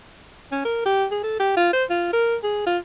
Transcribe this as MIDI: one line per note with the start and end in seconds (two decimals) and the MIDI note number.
0.52 0.61 61
0.65 0.83 70
0.85 1.06 67
1.11 1.20 68
1.23 1.37 69
1.39 1.57 67
1.57 1.73 65
1.73 1.84 72
1.90 2.09 65
2.13 2.36 70
2.43 2.66 68
2.67 2.78 65